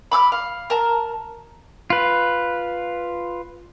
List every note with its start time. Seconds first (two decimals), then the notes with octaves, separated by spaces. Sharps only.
0.12 B5 D6 E6 F6
0.32 F5
0.70 A#4 A5
1.90 F4 B4